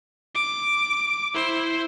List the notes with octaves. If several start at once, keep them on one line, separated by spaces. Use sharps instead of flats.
D6
E4 C5